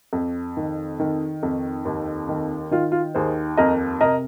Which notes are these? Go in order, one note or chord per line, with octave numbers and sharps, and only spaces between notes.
F2
D#3
D#3
F2
D#2
D#3
D#3 F4
F4
D#2 G#4 C5
F2 A#4 D#5
C3 A#4 D#5